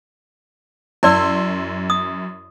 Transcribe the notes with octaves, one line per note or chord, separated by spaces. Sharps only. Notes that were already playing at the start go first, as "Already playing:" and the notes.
F#2 E4 D5 C6 E6
D#6